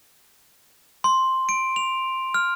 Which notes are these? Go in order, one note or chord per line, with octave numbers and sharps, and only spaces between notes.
C6
D7
F7
F6